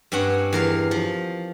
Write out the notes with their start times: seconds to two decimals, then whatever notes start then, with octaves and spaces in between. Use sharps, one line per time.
0.12 G2 C4 C#4 F#5
0.53 E2 A#4 F5
0.91 F3